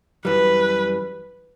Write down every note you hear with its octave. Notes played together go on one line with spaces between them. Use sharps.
F#2 E3 G3 B4